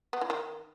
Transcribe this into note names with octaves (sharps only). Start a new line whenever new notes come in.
B3
E3
D#3